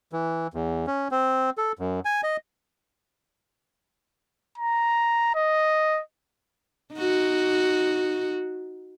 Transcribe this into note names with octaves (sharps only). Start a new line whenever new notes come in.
E3
E2
C#4
C4
A4
F#2
G#5
D#5
A#5
D#5
D#4 F#4